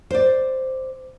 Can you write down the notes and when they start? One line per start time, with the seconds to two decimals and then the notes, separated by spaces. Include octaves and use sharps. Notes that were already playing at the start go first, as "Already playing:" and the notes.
0.11 C5 D5